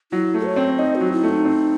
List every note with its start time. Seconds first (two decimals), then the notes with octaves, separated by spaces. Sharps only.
0.12 F#3 E4
0.34 A3
0.45 C#5
0.56 C4
0.78 D#4 D#5
0.95 F#4
1.01 F#3
1.12 E4
1.23 A3
1.29 D#4
1.45 C4